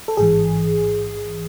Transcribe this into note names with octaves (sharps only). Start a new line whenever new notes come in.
A4
A1 G#2 E3 G#4